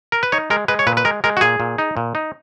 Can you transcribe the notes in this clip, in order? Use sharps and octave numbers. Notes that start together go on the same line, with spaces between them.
A#4
B4
D#4 C#5
G#3 A#4
G#3 B4
C#5
A#2 B4
B4
G#3 A#4
G#3 A#4
F#4
A#2 G#4
A#2
D#4
A#2
D#4